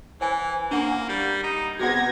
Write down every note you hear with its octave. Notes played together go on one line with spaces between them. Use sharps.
E3 C5 G#5
A#3 D4 F#5 C#6
G3
D#4
C3 B3 F#4 G#4 F#5 G#6 A#6